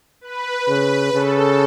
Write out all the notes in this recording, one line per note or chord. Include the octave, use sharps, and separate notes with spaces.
B4
C#3
C#3 A4